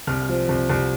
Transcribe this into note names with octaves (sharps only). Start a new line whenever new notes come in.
C2 F6
F6
F3
C2
C2